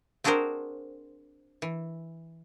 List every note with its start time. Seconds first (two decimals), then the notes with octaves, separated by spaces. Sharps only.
0.24 C4 D4 F#4 G#4 A#4 C5
1.62 E3